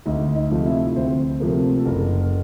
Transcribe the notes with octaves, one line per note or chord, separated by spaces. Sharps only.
D2 D#4 D#5
D#4 D#5
C3 F3 A3
E4 E5
D2 C4 C5
C3 F3 A3 A#3 A#4
A4
F#1 A#3 A#4